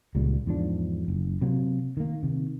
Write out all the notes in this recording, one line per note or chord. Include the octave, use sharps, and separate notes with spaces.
C#2 A#2 C#3 G3
E2 G#2 F3 D4
F#1
C3 F#3 A#3
D#3 A#3
C3 D#3